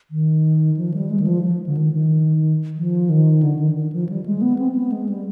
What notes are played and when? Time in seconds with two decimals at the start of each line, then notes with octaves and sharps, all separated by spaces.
0.11 D#3
0.77 F3
0.94 G3
1.10 G#3
1.20 D#3
1.27 F3
1.43 F3
1.66 D3
1.77 D#3
1.94 D#3
2.76 F3
3.09 D#3
3.43 D3
3.59 D#3
3.76 D#3
3.92 F3
4.09 G3
4.26 G#3
4.42 B3
4.59 C4
4.75 B3
4.92 G#3
5.09 G3